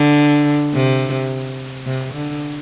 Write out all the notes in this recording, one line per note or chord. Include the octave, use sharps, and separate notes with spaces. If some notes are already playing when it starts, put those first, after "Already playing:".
Already playing: D3
C3
C3
D3